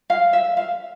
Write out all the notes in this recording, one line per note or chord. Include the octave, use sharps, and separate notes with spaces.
F5
E5
F5